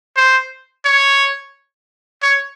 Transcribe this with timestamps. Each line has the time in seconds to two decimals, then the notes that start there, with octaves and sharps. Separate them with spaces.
0.17 C5
0.85 C#5
2.22 C#5